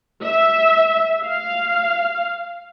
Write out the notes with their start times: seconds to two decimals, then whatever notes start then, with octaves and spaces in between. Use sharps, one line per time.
0.24 E5
1.25 F5